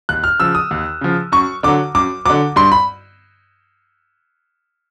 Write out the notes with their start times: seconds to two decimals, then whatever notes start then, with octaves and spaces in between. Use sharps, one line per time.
0.09 D#2 F#6
0.24 F6
0.40 C#3 F3 E6
0.55 D#6
0.71 D#2
1.01 C#3 F3
1.32 F#2 C#6
1.63 D3 F#3 D6
1.95 F#2 D6
2.26 D3 F#3 D6
2.56 G2 C6
2.72 B5